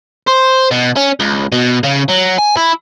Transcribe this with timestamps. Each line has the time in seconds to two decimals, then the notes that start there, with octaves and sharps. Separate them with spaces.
0.27 C5
0.71 B2
0.97 C#4
1.20 C#2
1.52 B2
1.83 C#3
2.08 F#3
2.38 G#5
2.57 E4